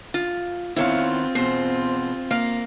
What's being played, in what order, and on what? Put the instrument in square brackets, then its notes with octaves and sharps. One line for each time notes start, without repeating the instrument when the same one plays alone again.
[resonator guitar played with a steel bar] F4
[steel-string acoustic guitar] D#3 B3 [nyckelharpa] C4 F4 [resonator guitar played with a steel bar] E4 C#5 F5
[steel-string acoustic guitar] E2 B2 [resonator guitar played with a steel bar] C5
[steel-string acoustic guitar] A#3 [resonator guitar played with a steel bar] F5